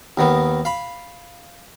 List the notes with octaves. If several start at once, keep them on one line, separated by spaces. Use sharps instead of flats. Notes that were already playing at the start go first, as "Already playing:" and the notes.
D#2 D#3 B3
F5 B5